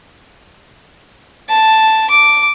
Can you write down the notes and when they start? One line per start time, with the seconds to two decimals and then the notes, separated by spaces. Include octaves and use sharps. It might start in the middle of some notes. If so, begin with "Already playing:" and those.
1.50 A5
2.10 D6